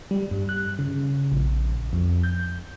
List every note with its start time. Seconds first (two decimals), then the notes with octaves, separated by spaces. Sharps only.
0.11 G3
0.31 G2
0.49 F#6
0.79 C#3
1.32 A#1
1.93 F2
2.23 G6